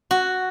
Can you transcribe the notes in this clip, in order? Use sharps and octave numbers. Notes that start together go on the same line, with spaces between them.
F#4